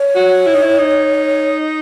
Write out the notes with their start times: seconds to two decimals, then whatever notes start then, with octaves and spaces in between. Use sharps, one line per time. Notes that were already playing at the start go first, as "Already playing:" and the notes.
Already playing: C#5
0.15 F#4
0.46 E4
0.54 D#4
0.62 E4
0.78 D#4